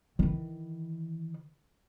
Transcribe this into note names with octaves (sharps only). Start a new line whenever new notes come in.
D#3 E3